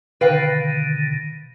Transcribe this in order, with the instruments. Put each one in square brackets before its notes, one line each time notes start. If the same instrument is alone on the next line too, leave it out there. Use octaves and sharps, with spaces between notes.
[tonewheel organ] B2 D3 D#3 [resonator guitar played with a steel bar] B4 F5 G5